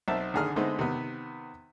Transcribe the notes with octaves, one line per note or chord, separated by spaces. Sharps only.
B1 C4 E5 A5
G#1 D3 G#4 A#5 F6
D3 G#3 A3 B3 C4 D#4
C3 D#3 B3